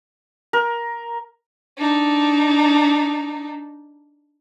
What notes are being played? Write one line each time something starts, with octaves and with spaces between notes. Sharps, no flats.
A#4
D4 D#4